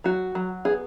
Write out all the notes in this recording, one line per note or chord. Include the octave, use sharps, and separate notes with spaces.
F#3 F#4
F#3
B3 G#4